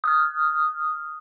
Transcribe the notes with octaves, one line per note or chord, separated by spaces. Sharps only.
D#6 F6